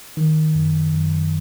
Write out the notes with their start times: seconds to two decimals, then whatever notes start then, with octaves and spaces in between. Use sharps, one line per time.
0.17 D#3
0.55 F#2
0.94 F#2